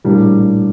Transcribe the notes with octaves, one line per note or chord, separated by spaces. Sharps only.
A#1 A2 G3 A#3 D4